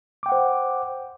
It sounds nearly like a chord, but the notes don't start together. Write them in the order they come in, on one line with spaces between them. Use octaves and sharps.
D6 G5 F#5 C5